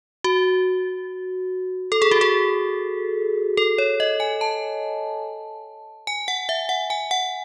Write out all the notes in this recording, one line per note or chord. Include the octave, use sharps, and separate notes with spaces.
F#4
A4
G#4
F#4
G#4
A4
C#5
D#5
G#5
A5
G#5
F#5
E5
F#5
G#5
F#5